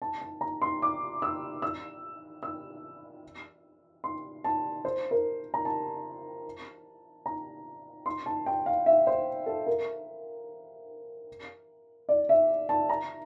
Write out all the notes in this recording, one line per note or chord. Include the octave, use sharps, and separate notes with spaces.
A5
A5
A#5
C6
D6
E6
E6
E6
C6
A5
C5
A#4
A#5
A5
A#5
C6
A5
G5
F5
E5
C5
A4
A#4
D5
E5
A5
A#5